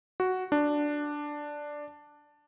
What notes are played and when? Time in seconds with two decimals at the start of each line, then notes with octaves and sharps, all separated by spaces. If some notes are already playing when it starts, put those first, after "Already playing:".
0.20 F#4
0.52 D4